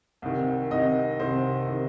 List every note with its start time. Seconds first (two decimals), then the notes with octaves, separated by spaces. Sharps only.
0.22 C2 C3 D#3
0.71 C2 C3 D#3 D#5
1.20 C2 C3 D#3 C5
1.69 C3 D#3